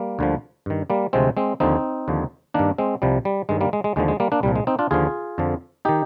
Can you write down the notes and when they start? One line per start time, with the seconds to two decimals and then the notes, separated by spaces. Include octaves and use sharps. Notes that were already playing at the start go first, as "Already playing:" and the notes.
Already playing: G3 A#3
0.19 D2 D3 F3
0.66 G2 D#3
0.90 G3 A#3
1.13 D2 C3 F3 G#3 C4
1.37 G#3 C4
1.60 D#2 D3 F3 C4 D#4
2.08 D#2 D3 F3
2.54 G2 D#3 A#3 D4
2.78 G#3 C4
3.02 C2 C3 F3 G3
3.25 G3
3.49 G2 D#3 G#3
3.61 G3 A#3
3.73 G#3
3.84 G#3
3.96 D#2 D3 F3 G#3
4.08 G#3
4.20 G3 A#3
4.32 A#3 D4
4.43 C2 A#2 F3 G3
4.56 G#3
4.67 C4 D#4
4.79 D4 F4
4.91 D#2 D3 F3 F4 G#4
5.38 F2 D3 F3
5.85 D#3 D#4 G4